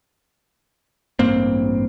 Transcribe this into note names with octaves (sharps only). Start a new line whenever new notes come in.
A1 G2 A#3 C4